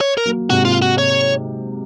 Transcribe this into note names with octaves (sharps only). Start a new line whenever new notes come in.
C#5
A#4
F#3 A#3
G#2 C3 F#4
F4
F#4
C#5